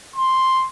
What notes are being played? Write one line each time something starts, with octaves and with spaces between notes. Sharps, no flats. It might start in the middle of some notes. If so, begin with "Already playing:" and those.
C6